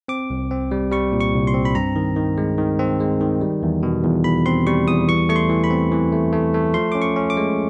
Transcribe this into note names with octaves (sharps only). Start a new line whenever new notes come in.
C4 D6
C2
C4
G3
G3 C#6
A#2
C#6
C2
C6
C4
B5
G2 A#5
D#3
D#3
G#3
D#3
C4
G#3
D#3
G3
E2
B2
E2
E2 B5
C4 C6
G3 C#6
E2 D#6
E3 C#6
A3 C#6
C6
E3
B5
C4
E3
A3
A3
A3
F3 C6
C#4 D6
C#6
C#4
D6
G#3